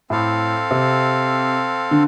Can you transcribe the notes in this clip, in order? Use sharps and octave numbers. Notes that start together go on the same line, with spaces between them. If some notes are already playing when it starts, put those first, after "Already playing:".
A2 C4 A4 F5
C3
D3